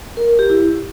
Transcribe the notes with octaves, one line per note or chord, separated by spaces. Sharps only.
A#4
A#4
G4
E4